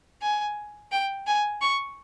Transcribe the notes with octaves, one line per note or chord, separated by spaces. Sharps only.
G#5
G5
G#5
C#6